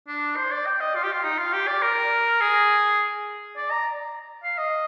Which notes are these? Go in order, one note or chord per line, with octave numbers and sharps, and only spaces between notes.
D4
C5
D5
G5
D#5
F4
G4
F4
D#4
F4
G4
D5
A#4
G#4
D5
A#5
F5
D#5